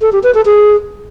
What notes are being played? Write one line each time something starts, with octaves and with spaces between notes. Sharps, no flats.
A4
G4
B4
A4
G#4